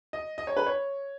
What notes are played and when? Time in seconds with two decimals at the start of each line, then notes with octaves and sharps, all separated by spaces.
0.13 D#5
0.38 D#5
0.47 C#5
0.57 B4
0.67 C#5